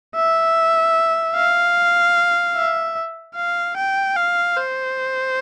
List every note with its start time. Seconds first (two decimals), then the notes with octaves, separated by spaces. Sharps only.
0.16 E5
1.36 F5
2.56 E5
3.36 F5
3.77 G5
4.17 F5
4.57 C5